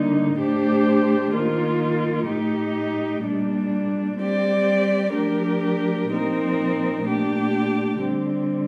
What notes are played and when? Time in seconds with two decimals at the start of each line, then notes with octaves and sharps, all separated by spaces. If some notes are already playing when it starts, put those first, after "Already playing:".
Already playing: D3 G3 A#3 D#4
0.37 A2 A3 D4 G4 C5
1.33 D#3 A#3 F4 A#4
2.28 A2 A3 D#4 G4
3.24 A#2 G3 A#3 D4
4.19 G3 C4 G4 D5
5.14 F3 A3 D4 G4 A#4
6.10 A#2 F3 C4 D#4 A#4
7.05 A#2 A3 D4 G4
8.01 D3 G3 C4